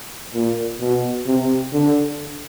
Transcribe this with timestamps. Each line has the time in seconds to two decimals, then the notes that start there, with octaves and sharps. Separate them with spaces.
0.34 A#2
0.80 B2
1.27 C3
1.73 D3